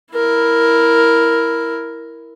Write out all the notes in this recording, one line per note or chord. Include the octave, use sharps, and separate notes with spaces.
E4 A#4